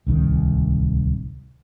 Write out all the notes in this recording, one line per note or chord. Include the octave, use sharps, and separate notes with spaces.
D1 C2 D#3